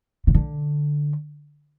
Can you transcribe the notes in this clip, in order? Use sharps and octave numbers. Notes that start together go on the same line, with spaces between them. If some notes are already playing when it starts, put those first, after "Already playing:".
C#3
D3